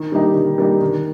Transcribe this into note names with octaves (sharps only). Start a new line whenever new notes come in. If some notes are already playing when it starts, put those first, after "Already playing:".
Already playing: D#3
G3 A#3 D#4 G4
D#3
G3 A#3 D#4 G4
D#3